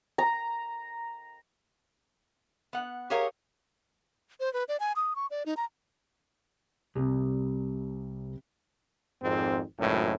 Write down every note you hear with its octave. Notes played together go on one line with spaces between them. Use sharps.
A#5
B3 F#5
G4 G#4 A#4 C#5 F5
C5
B4
D5
G#5
D#6
C#6
D5
D#4
A#5
C2 C3 G3
G#1 F2 G#2 C4
G#1 C#2 F#2 A2